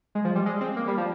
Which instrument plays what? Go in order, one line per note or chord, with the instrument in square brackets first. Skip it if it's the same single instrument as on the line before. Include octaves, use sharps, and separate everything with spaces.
[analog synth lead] G#3
F3
G3
G#3
C4
A#3
G3
F3